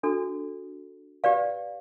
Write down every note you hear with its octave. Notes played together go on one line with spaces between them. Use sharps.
D4 F#4 A4
G4 B4 D5 F5